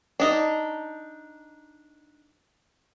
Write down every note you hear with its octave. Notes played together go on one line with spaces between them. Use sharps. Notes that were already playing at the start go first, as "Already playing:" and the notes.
D4 D#4